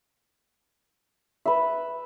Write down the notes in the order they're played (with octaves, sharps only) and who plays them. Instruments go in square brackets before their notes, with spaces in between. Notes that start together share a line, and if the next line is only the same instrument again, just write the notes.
[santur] B4 E5